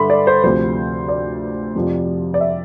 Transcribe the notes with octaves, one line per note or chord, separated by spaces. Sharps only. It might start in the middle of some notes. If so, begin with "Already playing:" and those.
Already playing: G2 D3 E5 B5 C6
D5
C5
D2 C3 F3 C5
D5
F2 C3 F3
D5
E5